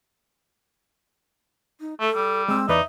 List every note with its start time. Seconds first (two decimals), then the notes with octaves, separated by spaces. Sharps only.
1.80 D#4
2.00 A3 A4
2.15 G3
2.48 G#3 C4 E6
2.69 E2 D#4 B4 D5 E5